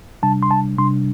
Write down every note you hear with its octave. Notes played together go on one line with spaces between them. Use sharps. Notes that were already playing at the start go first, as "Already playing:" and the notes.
C3 G3 D4 A5
C6
A5
C3 G3 D4 C6